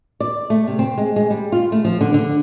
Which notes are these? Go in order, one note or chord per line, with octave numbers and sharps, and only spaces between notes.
D5
A3
C3
C4
G#3
G#3
G3
F4
A3
F3
D3
D3